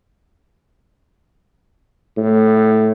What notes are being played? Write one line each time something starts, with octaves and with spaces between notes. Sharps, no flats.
A2